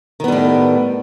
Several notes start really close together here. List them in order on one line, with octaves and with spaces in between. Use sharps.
D#3 B3 G3 A2